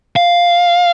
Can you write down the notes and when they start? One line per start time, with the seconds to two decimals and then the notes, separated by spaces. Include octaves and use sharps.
0.16 F5